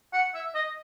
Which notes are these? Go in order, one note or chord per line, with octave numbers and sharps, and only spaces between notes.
F#5
E5
D#5